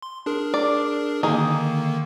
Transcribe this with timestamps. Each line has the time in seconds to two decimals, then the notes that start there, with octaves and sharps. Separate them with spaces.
0.02 C6
0.26 D4 G#4 A#4
0.54 D5
1.23 D3 D#3 A#3 D#4 G#4